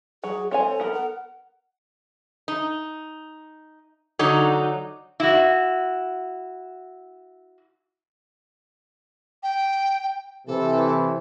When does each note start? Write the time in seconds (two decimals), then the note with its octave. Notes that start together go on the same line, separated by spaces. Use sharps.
0.24 F#3 G#4
0.51 C4 A4 C#5 G#5
0.80 B3 A#4
0.93 F#5
2.48 D#4
4.19 D3 F#3 D#4
5.20 E4 F#4
9.43 G5
10.47 C3 E3 A4